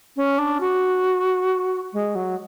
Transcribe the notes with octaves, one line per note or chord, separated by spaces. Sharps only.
C#4
D4
F#4
G#3
F#3